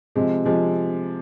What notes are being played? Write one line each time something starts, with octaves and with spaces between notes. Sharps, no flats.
C3 F3 G#3
C3 F3 G#3